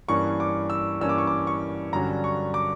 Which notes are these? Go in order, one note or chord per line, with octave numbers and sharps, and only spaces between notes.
G2 E3 A#3 C#4 C#6
D6
E6
G2 E3 A#3 C#4 E6
D6
C#6
D6
C#6
G2 D3 F#3 C#4 A#5
C#6
D6